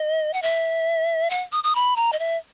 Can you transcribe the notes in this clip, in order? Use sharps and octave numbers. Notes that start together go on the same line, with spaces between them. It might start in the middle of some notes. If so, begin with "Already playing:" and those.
Already playing: D#5
F#5
E5
F#5
D#6
D#6
B5
A#5
D#5
E5